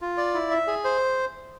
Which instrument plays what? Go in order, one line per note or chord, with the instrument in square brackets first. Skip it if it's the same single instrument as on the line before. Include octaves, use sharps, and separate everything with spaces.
[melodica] F4
D5
E4
E5
G#4
C5